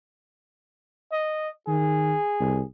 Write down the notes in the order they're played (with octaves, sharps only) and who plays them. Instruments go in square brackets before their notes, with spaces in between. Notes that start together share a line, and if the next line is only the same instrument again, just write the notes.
[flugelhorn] D#5
[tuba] D#3 [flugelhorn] G#4
[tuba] C2